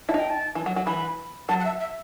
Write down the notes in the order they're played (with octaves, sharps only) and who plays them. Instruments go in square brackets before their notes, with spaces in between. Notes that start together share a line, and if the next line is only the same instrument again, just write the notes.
[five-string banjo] E4 [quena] A5
[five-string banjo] D#4
[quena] G5
A5
[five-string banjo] E3
F#3
F#3
[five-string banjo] E3 [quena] B5
[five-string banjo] F#3 [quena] A5
[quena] F#5
E5
E5